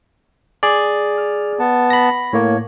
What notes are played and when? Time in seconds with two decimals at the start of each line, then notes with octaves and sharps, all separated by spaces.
0.63 G#4 D5
1.18 F6
1.59 B3 A5
1.90 B5 A#6
2.33 A2 A#3 C#5